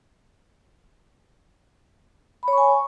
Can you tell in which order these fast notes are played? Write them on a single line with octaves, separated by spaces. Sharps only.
B5 C#5 C#6 G#5